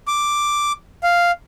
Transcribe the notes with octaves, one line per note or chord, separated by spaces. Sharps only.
D6
F5